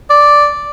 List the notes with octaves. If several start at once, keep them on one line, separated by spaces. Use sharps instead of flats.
D5